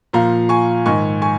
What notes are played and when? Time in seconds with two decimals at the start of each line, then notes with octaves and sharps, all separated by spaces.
0.13 A#2 F3 F5 A#5
0.49 G#5 C#6
0.86 G#2 D#3 G#5 C#6
1.22 G#5 C#6